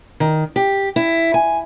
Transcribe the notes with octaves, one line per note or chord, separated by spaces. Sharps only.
D#3
G4
E4
G#5